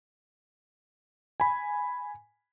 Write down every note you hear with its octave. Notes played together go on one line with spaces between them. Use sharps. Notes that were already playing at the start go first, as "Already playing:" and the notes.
G#5 B5